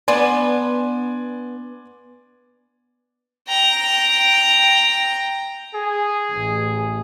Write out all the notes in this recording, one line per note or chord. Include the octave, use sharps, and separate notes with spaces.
B3 D4 B4 D5 G#5 C6
G5 A#5
G#4
A1